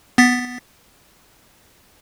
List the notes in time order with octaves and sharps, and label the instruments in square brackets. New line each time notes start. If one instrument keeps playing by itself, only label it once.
[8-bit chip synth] B3 A6 B6